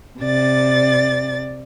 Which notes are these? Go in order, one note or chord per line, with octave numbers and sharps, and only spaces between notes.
C3 D5 A6